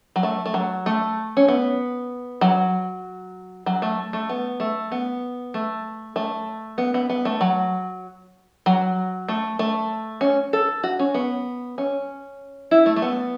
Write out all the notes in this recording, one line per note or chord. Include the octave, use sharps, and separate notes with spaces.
F#3
A3
A3
F#3
A3
C#4
B3
F#3
F#3
A3
A3
B3
A3
B3
A3
A3
B3
B3
B3
A3
F#3
F#3
A3
A3
C#4
A4
F#4
C#4
B3
C#4
E4
A3
A3
B3